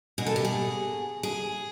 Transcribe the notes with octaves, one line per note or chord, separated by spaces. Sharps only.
B2 G#4
A4
G4
G#4
G#4